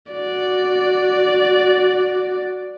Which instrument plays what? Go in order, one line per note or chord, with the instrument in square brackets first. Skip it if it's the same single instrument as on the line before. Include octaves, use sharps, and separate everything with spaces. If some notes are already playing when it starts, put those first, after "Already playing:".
[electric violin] F#4 D5